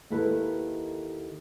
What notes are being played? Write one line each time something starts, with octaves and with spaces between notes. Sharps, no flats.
D#2 D#3 E4 A4 B4